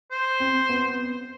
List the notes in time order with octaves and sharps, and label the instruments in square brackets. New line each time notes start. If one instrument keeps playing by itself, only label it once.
[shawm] C5
[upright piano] C4
B3